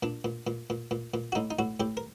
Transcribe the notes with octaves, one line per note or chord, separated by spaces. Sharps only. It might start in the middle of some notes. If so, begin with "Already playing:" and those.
A#2 D4
A#2
A#2
A#2
A#2
A#2
F#4
A2 D#4
D#4
A2 F#4
A2 G4
A#4